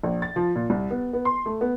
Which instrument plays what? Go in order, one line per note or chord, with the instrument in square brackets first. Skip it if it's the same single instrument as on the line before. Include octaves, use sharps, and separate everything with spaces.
[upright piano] A#1
A6
F3
A#2
C2
B3
B3
C6
A3
B3